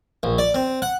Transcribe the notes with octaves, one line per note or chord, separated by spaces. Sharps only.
A#1
D5
C4
F#5